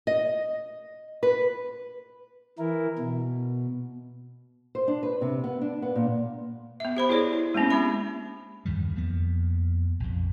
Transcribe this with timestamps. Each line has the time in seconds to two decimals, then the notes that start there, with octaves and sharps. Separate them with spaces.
0.07 D#5
1.23 B4
2.59 E3 E4 A#4
2.98 B2
4.75 C5
4.88 D4
5.03 B4
5.21 C3
5.44 B3
5.61 D4
5.82 B3
5.95 A#2
6.80 B3 E5
6.97 G4 C5 B5
7.09 E4 G#4 C#5 D5
7.33 E4
7.54 G#3 A#3 B3 C#4 D4
7.70 C4 G4 E5 B5
8.65 E2 G2 D#3 G3
8.95 F2 F3 A#3 B3
10.00 A#1 F2